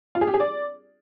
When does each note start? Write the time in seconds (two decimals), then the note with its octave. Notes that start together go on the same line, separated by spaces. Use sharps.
0.15 F4
0.21 G#4
0.27 G4
0.34 G#4
0.40 D5